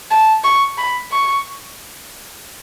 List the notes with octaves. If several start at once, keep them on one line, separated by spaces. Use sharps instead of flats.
A5
C#6
B5
C#6